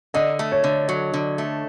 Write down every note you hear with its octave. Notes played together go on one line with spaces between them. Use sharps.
D3 D#5
A3
C#5
D3
F#3
D3
A3